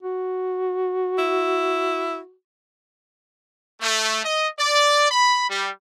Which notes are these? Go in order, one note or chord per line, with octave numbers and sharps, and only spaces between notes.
F#4
E4
A3
D#5
D5
B5
G3